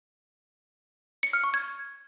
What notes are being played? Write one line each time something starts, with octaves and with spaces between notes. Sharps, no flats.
C#7
F6
C#6
G#6